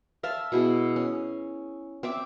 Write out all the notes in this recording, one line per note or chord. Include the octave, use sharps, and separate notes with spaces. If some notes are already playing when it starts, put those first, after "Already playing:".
E5 F5 A5 C6
B2 E4 G#4
C#4
C4 E5 D6